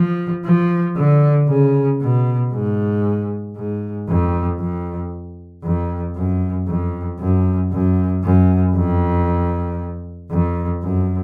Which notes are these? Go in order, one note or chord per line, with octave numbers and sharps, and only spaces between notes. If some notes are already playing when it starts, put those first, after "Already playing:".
Already playing: F3
F3
D3
C#3
B2
G#2
G#2
F2
F2
F2
F#2
F2
F#2
F#2
F#2
F2
F2
F#2